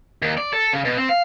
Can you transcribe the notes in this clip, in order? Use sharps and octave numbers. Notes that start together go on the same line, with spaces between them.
D#2
D5
A4
C#3
B2
C4
F5